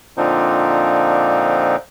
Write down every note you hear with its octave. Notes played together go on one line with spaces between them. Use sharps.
A#2 D3 F3 C4 D4 D#4